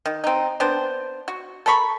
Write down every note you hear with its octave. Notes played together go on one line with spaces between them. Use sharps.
D#3
C4 D#4
B3 C4 D4 C5
F#4
A4 A#4 B5 C#6